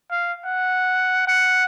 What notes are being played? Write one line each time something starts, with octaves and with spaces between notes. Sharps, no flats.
F5
F#5
F#5